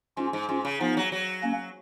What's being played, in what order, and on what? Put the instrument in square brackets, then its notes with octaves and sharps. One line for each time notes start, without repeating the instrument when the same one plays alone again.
[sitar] G#2 [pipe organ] C#4 F4
[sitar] G#2
[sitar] G#2 [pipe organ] C#4 F4
[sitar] C#3
[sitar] F3 [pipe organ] B3 D#4
[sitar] F#3
F#3
[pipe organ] A#3 C#4